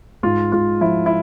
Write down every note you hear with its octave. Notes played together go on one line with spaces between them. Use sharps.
G#2 F4
G#2 F4
F3 E4
E4